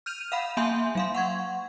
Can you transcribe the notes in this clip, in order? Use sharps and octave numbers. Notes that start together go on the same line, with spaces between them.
F6 G6 D#7 F7
F5 F#5 B5
A#3 E5 G#5 C6 G6
F#3 F5 C6
F#5 C#6 G#6